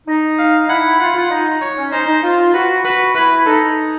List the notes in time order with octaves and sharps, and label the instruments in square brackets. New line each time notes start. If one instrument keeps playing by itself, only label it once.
[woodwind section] D#4
[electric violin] F5
[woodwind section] E4 [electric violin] F#5
[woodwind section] F4 [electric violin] F#5
[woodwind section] F4
D#4
[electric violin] C#5
[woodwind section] C#4
[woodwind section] D#4 [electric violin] C5
[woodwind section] D#4
F4
[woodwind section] F#4 [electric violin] B4
[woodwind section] F#4 [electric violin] B4
[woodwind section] E4 [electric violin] B4
[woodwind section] D#4 [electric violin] A4